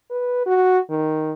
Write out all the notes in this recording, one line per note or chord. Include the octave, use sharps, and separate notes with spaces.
B4
F#4
D#3